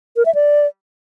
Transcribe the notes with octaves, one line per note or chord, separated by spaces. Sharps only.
A#4
E5
D5